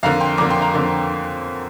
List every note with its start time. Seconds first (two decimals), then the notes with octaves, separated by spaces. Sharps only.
0.03 F2 D3 A#3 F5 A#5
0.20 G5 C6
0.38 F2 D3 A#3 A#5 D6
0.50 G5 C6
0.61 F5 A#5
0.74 F2 D3 A#3